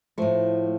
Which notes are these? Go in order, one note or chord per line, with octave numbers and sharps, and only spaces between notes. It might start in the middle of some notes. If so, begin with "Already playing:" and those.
A2 F3 A3